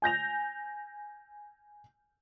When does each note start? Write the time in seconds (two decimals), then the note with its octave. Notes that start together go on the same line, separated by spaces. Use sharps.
0.02 G#5 G6 A#6 F7